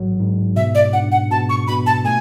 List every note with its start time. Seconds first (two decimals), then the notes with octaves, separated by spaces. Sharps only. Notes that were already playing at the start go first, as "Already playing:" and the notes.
Already playing: A1 G#2 F#3
0.20 G#2
0.56 B2 E5
0.75 D5
0.93 D4 F#5
1.12 F#5
1.30 B2 A5
1.49 C#6
1.67 B2 B5
1.86 A5
2.05 A3 G#5